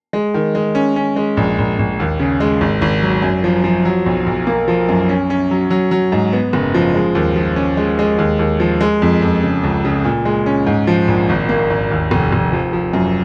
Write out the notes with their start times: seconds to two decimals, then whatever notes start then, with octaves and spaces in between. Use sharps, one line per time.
0.13 G#3
0.34 D#3
0.55 G#3
0.75 C#4
0.96 C#4
1.16 G#3
1.37 A#1
1.58 A#1
1.79 A#1
2.00 D#2
2.20 C#3
2.40 G#3
2.61 G#1
2.82 G#1
3.02 F#3
3.22 F#2
3.44 F3
3.64 F3
3.85 F#3
4.06 B1
4.26 B1
4.47 A#3
4.68 F3
4.89 F#2
5.09 C#4
5.30 C#4
5.51 F#3
5.70 F#3
5.91 F#3
6.12 G#2
6.33 B3
6.53 F#1
6.74 F3
6.94 G#3
7.15 D#2
7.36 F3
7.56 C#4
7.77 G#3
7.99 G#3
8.18 D#2
8.39 D#2
8.60 F3
8.81 G#3
9.02 F2
9.22 F2
9.43 C#3
9.63 C#2
9.85 C#3
10.04 A#2
10.25 G#3
10.46 C#4
10.67 G#2
10.87 F3
11.08 A#1
11.29 G#1
11.49 A#3
11.70 G#1
11.91 D#2
12.11 F1
12.32 F1
12.53 F3
12.73 F3
12.93 F#2